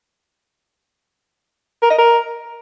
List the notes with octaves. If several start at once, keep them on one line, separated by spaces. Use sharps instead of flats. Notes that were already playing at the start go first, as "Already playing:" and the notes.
A#4
D#5
A#4